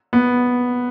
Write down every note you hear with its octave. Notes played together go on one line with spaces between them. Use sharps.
B3